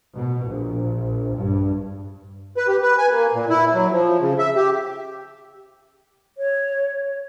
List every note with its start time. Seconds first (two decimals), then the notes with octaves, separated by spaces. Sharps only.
0.16 B2
0.45 A#1
1.36 G2
2.56 B4
2.68 G4
2.82 B4
2.98 G#5
3.11 A#3
3.34 A#2
3.50 E4
3.73 F#3
3.92 F3
4.20 C#3
4.39 E5
4.56 G4
6.38 C#5